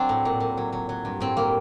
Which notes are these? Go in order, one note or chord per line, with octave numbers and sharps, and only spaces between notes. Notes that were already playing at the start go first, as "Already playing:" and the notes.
Already playing: F#3 C4 D4
A2
A#2
A#2
F#3
F#3
F#3
G2
A2 C4
G3 A#3